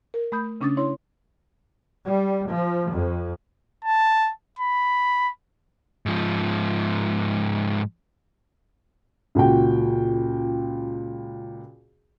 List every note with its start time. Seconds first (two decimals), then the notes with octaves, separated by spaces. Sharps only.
0.14 A#4
0.32 A3 B5 D#6 G6
0.61 C#3 C#4 D4 D6 D#6 A6
0.77 E4 C#5 C6
2.05 G3
2.47 F3
2.90 F2
3.84 A5
4.59 B5
6.06 G#2 F3
9.35 C#2 A#2 F#4 G5